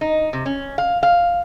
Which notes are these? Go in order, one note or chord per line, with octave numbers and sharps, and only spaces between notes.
D#4
C3
C#4
F5
F5